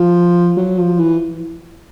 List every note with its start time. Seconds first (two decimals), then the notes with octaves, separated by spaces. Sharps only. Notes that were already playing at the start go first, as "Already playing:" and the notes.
Already playing: F3
0.57 F#3
0.79 F3
1.00 E3